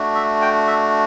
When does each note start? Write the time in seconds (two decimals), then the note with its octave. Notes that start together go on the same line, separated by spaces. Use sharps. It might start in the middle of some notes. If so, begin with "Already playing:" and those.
Already playing: A3 D4 F#4
0.15 E5
0.41 G5
0.67 E5